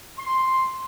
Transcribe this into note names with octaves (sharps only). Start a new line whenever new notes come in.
C6